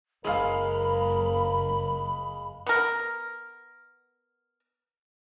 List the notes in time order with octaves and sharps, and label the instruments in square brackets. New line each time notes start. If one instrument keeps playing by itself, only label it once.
[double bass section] F#1 [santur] G#3 F5 [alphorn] A#4 [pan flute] B5
[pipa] B3 A#4